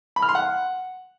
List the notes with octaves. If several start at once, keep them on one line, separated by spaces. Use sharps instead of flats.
B5
F6
C6
F#5